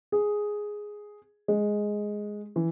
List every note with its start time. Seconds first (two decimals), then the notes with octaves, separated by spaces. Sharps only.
0.12 G#4
1.48 G#3
2.56 E3